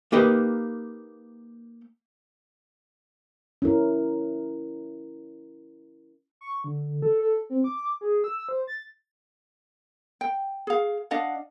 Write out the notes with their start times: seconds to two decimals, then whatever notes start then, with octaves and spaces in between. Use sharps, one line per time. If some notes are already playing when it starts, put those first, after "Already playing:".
0.12 A#3 D#4 G4 A#4 B4 D#5
3.62 C#4 E4 A#4
6.41 C#6
6.64 D3
7.02 A4
7.22 A4
7.50 C4
7.64 D6
8.01 G#4
8.24 E6
8.49 C5
8.67 A6
10.21 G5
10.67 G#4 F5
11.11 D4 D#5 F5 F#5